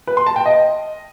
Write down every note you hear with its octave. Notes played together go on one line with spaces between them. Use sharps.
B4
C6
A5
G5
D#5